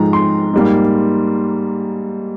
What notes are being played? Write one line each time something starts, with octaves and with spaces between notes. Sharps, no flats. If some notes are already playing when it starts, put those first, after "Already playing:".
Already playing: G#2 F3 G#3 A#5
C6
G#2 G3 A#3